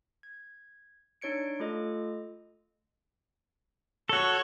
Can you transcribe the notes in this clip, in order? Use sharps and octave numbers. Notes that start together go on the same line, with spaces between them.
G#6
D4 D#4 C#5 G#6 C#7 D7
A3 F4 A4 D#5
F#4 A4 C#5